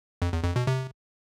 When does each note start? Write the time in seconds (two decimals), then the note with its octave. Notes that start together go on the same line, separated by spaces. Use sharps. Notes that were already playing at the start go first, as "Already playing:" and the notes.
0.22 F2
0.33 E2
0.44 F2
0.56 B2
0.67 C3